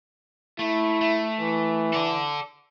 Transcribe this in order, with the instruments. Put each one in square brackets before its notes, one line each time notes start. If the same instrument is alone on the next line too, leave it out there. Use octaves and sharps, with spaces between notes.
[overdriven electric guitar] A3 [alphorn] E4
[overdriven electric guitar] A3
[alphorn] E3
[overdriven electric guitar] A4 D5